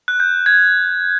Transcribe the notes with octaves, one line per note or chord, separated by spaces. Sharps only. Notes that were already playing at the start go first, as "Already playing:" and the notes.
F#6
G6
G#6